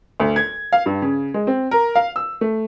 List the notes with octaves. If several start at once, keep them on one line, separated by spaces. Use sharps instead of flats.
D2
G#6
F5
G2
C#3
G#3
C4
A#4
F5
E6
A3